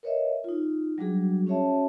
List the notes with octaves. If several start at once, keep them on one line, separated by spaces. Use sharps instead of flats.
A#4 B4 C#5 D#5 E5
D#4 F4
F#3 G3 D4 F#4 G#4
C#4 F#4 G#4 C#5 E5 A5